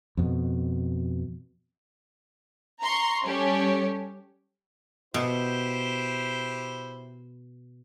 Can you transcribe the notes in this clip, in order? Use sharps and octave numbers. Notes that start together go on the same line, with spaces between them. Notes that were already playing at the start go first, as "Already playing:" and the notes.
F2 B2
A#5 C6 C#6
G3 C#4 G4 A4 C#5
B2 E4 G4 C5